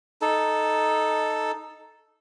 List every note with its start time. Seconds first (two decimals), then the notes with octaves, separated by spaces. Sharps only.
0.21 D#4 A4